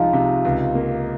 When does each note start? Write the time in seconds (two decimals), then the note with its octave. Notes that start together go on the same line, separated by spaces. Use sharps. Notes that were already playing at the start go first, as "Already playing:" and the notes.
Already playing: C2 F3 G#3 D#4 F4
0.13 C3
0.45 C#2
0.75 A#3